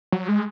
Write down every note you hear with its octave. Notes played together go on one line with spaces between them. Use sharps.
F#3
G#3